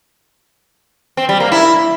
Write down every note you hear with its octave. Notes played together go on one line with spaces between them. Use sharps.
C4
G3
A#3
E4